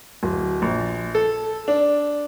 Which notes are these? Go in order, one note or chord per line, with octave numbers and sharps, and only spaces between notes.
D1
A#1
A4
D4